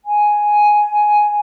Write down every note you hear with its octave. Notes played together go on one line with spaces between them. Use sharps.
G#5